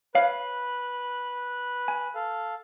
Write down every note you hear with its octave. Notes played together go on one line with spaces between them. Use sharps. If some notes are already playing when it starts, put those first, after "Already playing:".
B4 C#5 F5 F#6
G#5
A4 F5